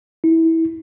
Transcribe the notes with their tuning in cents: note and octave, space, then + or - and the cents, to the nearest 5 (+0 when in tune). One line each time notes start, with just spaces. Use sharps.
E4 -20